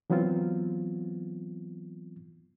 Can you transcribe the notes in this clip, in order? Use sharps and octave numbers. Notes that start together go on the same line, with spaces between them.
E3 F#3 B3 C4 F4